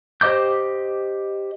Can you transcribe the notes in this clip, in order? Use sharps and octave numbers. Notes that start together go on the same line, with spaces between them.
G4 C5 D#5 D6 G6